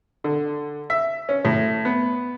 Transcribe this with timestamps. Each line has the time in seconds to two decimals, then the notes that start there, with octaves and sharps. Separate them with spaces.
0.24 D3
0.90 E5
1.29 C#4
1.45 A2
1.85 B3